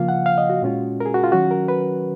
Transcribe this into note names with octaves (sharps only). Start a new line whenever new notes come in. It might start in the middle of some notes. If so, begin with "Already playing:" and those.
Already playing: C#3 F3 A#3 F4 F5
F#5
F5
D#5
F#4
A#2 G#3 C#4 F4
A#4
G#4
F#4
F4
D#3 F#3 C#4 F#4
A#4
B4